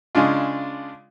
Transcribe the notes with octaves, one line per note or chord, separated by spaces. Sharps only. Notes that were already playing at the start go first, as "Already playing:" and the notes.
C#3 G#3 D4 F4